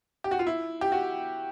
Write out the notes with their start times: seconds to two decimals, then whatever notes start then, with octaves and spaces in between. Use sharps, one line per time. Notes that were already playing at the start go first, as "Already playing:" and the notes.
0.24 G4
0.31 F#4
0.39 F4
0.47 E4
0.81 G4
0.92 F#4